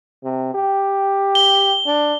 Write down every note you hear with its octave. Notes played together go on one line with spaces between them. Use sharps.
C3
G4
G7
D4